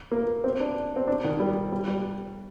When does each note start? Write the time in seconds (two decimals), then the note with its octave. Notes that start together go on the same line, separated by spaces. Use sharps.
0.11 A#3
0.44 C4
0.60 D4
0.96 C4
1.08 D4
1.24 D#3
1.40 G3
1.72 G3
1.88 G3